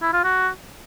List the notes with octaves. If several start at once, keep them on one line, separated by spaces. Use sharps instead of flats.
E4
F4
F#4